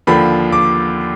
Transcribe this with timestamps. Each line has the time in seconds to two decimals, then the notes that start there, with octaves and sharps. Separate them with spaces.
0.07 D#2 D3 F3 B5
0.52 D6